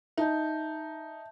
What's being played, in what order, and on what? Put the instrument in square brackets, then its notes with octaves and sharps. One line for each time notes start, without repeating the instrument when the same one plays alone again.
[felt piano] D#4 [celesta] E5 A5 G6